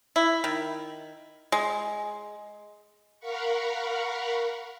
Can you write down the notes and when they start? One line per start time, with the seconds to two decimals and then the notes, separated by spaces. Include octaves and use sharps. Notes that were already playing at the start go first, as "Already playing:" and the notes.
0.16 E4
0.44 D#3
1.52 G#3
3.20 A#4 F5 F#5 B5 C#6